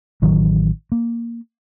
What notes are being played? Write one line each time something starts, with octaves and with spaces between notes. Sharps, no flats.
A1 D#3 F#3
A#3